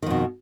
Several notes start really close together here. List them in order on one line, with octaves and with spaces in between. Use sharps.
D#3 F2 B2